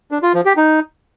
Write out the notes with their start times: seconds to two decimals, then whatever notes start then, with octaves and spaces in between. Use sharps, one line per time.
0.11 D4
0.23 F4
0.34 F3
0.46 G4
0.57 D#4